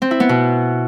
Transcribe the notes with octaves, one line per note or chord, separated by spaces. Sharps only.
C4
E4
B3
B2